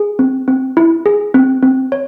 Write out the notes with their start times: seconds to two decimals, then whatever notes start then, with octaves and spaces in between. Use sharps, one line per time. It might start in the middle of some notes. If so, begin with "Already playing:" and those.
Already playing: G#4
0.19 C4
0.48 C4
0.77 E4
1.06 G#4
1.34 C4
1.63 C4
1.92 C#5